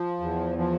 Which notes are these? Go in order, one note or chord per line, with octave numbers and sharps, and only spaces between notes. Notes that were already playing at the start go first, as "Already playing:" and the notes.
Already playing: F3
E2
F3